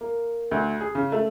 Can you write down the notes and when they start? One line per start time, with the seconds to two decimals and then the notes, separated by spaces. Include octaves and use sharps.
0.01 A#3
0.51 D2
0.81 G#4
0.95 C#3
1.12 A3